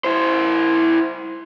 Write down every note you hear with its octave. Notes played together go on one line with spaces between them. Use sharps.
E4 C5